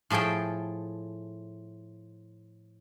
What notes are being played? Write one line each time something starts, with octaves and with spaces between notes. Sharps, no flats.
A2 F3 G#4 A4 G5